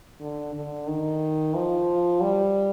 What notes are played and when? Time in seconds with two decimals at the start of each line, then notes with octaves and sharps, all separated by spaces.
0.20 D3
0.54 D3
0.87 D#3
1.54 F3
2.21 G3